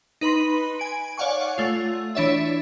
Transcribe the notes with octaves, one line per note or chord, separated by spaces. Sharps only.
D#4 B4 B5 C6
G#5 D7
C#5 D5 F5 F#5 G#5 C#6
A3 F4
E3 D4 E4 C#5 D5 E5